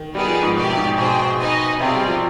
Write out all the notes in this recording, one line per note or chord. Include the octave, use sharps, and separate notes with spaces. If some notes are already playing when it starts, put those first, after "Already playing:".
Already playing: D#3
G3 B3 D#4 G#4 D5
F3
G#2
B2 G4 D5 G#5
C3
G#2
B2 G#4 C5 G5
D#4 B4 D#5 G#5
C3 C4 F4 G#4 D5
G3
F3